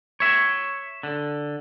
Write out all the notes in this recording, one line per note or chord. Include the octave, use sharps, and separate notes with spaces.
C#5 E5
D3